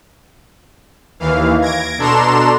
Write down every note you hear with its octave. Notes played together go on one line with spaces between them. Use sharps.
D#2 E3 F5
G#6 A#6 D7
B2 D4 A4 A#5 C6 E7